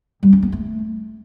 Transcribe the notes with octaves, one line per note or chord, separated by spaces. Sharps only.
G3
C#4
B3
A3